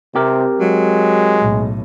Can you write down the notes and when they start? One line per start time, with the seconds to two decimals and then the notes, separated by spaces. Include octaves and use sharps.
0.15 C3 C4 G4 A#4
0.60 F#3 G#3
1.37 B1 A2